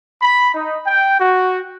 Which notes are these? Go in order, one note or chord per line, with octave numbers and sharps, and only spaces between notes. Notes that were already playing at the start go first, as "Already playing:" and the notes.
B5
D#4
G5
F#4